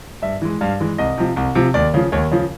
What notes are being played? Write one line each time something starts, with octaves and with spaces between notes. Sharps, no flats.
G2 E5
E3 G#3
G2 F5
E3 G#3
C2 D#5
C3 F3
C2
C3 F3
D#2 D5
C#3 F3
D#2 C#5
C#3 F3